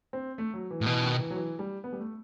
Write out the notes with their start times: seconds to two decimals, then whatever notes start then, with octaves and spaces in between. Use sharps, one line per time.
0.13 C4
0.38 A3
0.54 F#3
0.71 E3
0.81 A2
0.86 B2 E3
1.03 D#3
1.19 E3
1.30 F#3
1.36 E3
1.59 G3
1.84 B3
1.92 G3
2.00 A3